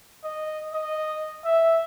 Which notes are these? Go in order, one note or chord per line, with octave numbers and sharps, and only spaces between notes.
D#5
D#5
E5